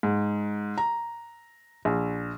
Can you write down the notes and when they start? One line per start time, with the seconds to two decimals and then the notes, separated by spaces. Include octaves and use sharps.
0.03 G#2
0.78 A#5
1.85 A#1